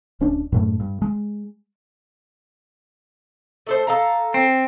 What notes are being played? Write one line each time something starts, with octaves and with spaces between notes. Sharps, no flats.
D1 C#4 D4
F#2 A2 A3
G2
G#3
A3 A4 C5
A4 F5 A#5
C4